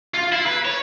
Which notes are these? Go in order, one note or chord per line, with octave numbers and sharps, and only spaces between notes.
F4
E4
B4
C#5